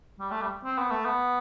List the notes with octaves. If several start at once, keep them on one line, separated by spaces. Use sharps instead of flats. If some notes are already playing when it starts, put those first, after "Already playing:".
G3
A3
G3
C4
B3
A3
B3